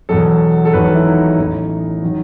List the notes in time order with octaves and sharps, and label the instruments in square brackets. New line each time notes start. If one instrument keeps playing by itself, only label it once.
[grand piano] E2 B2 F#3 A4
A4
E1 E2 D#3 F#3 B4
A4
E4
D#4
A1 A2 E3
D#3 F#3